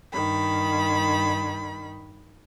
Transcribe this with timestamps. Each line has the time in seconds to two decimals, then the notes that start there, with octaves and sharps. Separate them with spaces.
0.13 G2 D#3 B5